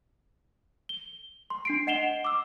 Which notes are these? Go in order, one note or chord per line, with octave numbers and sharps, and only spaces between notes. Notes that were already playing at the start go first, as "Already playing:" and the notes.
G7
C6
D4 C7 D7
D#5 F#5 C7 E7 F7 G7
D6 E6